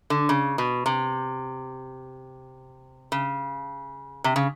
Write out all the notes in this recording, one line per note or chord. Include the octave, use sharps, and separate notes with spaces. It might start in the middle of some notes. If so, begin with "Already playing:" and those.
D3
C#3
B2
C3
C#3
C3
C#3